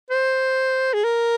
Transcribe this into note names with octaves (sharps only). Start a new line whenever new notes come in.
C5
G#4
A#4